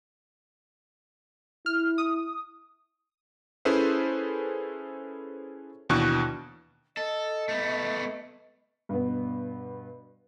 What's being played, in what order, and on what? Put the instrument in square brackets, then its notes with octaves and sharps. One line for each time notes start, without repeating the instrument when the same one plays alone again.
[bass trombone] E4 [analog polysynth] F6
[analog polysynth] D#6
[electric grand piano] C#4 E4 G#4 A4 B4 C5
D#2 B2 E3 D4 C#6 F#6
[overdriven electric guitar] A4 [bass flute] D#5
[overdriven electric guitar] A3 B3
[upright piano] G2 B2 B3